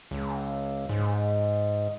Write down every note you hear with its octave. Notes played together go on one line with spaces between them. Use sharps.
C#2
G#2